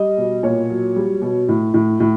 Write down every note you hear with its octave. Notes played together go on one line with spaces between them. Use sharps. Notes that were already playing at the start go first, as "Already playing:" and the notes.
Already playing: G3 D#5
B2
A#2 C#5
F#3
G3
B2
A2
A2
A2